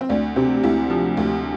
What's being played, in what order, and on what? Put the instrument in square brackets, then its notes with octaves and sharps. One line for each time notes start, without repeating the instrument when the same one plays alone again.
[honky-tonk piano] C4
D2 D4
C3 C4
D2 E4
F3
D2